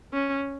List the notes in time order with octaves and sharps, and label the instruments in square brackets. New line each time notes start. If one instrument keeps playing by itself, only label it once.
[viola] C#4